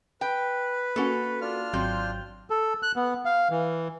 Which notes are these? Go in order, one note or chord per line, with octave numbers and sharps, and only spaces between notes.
B4 G5
A#3 C#4 F#4 A4
D4 F4 F6
G#1 F#3 C4 G6
A4
F#6
B3
F5
E3